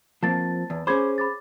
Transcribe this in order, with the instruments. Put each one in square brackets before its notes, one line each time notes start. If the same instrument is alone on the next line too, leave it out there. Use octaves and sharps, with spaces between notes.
[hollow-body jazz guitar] F3 A#3 C4 [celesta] A5 A6
[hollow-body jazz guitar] E2
[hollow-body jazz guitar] C#4 G#4 C5 [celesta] B5 D6 G#6
[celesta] B5 D6 A6